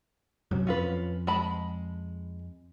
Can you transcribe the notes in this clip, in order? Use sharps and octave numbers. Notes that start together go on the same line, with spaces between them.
F#2 C3 F#3
F2 C#4 F4 B4
G#3 A5 B5